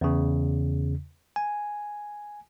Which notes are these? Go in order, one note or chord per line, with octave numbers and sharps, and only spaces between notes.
E2 C#3
G#5